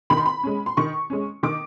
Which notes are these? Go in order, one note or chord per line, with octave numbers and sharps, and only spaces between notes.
D#3 B5
C6
B5
G#3 C#4
C6
D#3 C#6
G#3 C#4
D#3 D6